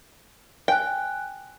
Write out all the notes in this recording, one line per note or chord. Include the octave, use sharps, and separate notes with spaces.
G5 G#5 F#6